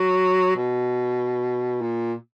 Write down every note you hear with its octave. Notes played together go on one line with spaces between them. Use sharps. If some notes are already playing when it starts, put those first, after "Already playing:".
Already playing: F#3
B2
A#2